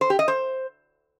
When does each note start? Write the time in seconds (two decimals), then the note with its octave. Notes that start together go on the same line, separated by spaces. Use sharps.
0.01 C5
0.10 G4
0.19 D#5
0.28 C5